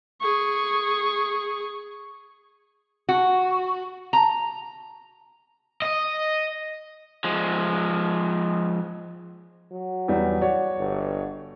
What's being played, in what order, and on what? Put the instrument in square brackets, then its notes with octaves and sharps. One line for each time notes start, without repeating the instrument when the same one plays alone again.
[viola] G#4 C#6
[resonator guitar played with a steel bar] F#4
A#5
[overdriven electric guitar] D#5
F3 G#3
[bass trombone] F#3
[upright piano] E2 G3
F#4 C#5 D5
[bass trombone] G1